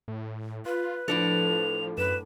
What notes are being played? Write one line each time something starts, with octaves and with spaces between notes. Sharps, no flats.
A2
F4 B4
A2 F3 D4 A4 F7
F#2 B4 E7